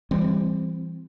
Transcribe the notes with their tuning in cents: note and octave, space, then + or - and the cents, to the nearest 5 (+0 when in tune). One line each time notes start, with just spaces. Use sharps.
E3 +25 G3 +20 C4 +0